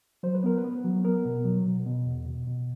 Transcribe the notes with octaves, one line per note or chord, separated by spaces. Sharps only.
F#3 C5
B4
B3 A#4
B4
B3
F#3
B3 A#4
B2
F#3
B2
B2
E2
B2
B2